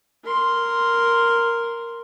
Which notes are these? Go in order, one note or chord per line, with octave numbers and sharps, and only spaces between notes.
A#4 C6